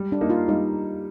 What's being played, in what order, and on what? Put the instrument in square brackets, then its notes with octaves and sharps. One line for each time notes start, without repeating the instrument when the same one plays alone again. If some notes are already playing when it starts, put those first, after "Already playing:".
Already playing: [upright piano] G3
[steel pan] D4
[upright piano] A#3 D#4
[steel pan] F4
[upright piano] G3 [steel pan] D#4